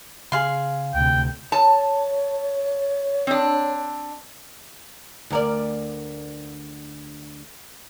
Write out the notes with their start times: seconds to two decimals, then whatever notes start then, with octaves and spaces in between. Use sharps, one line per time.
0.32 C#3 G#4 F5 C6
0.95 D2 C3 G5
1.52 C#5 A5
3.27 C4 D4
5.30 D2 A#4 D5